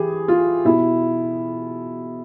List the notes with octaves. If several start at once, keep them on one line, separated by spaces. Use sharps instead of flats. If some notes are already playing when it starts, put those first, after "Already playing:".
Already playing: E3 G4 G#4
F4
B2 E4